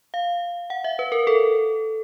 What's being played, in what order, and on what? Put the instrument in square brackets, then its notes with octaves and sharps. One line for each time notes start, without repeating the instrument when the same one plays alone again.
[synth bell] F5
F#5
E5
B4
A#4
A4